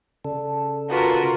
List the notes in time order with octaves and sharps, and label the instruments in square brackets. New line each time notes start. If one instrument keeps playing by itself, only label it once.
[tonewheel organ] C#3 A4 [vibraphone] D5 A5
[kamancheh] F4 A#4 [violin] F#4 B4